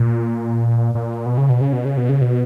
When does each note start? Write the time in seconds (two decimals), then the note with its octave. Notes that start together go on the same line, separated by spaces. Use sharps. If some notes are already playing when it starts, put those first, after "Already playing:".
Already playing: A#2
0.95 A#2
1.26 B2
1.38 C#3
1.50 B2
1.61 C#3
1.73 B2
1.85 C#3
1.97 B2
2.09 C#3
2.21 B2